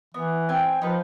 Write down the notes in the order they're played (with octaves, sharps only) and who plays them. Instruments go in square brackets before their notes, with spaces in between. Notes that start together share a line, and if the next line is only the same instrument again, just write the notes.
[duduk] E3 [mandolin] B3
[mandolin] C4 G5 G#5
[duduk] F3 [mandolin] D#4 B4